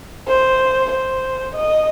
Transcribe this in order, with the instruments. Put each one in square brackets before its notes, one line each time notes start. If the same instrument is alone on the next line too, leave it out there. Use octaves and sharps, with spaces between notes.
[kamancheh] C5
C5
D#5